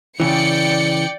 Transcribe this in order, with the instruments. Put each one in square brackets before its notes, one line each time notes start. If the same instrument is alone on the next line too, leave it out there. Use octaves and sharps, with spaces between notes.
[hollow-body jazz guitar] C#3 E3 [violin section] D5 G5 C#7